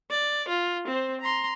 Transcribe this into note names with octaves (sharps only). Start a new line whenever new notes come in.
D5
F4
C4 C5
A#5 C6